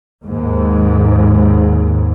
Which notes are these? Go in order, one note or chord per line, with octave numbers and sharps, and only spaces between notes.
D#2 G#2